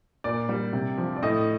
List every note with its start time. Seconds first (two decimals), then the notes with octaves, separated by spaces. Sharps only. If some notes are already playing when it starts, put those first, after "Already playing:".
0.24 A#2 D5
0.49 G3
0.73 C3
0.98 F3
1.16 D5
1.23 A2 D#5